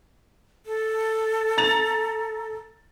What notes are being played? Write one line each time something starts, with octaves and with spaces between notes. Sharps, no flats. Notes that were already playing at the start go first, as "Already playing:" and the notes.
A4
A#5 A6 F7